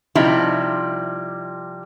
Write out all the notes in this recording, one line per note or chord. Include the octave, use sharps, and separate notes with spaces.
C3 F3 G3 D#4 E4